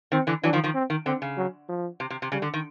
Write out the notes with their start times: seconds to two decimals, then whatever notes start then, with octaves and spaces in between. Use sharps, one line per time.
0.12 D#3 C4
0.27 D3 E3
0.43 E3 F#3 D4
0.53 D#3 F3
0.64 D#3 F3
0.74 C4
0.90 D#3
1.06 D3 C4
1.22 C#3
1.37 F#3
1.69 F3
2.00 C3
2.10 C3
2.22 C3
2.32 C#3 G3
2.42 D3
2.54 D#3